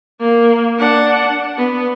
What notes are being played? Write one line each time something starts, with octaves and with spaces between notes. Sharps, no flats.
A#3
D4 F#5
B3